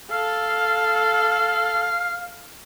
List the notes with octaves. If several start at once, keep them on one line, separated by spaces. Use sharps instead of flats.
A4 F5